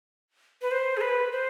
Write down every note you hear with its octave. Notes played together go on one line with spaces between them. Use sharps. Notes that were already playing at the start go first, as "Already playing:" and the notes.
B4
C5
G#4
B4
C5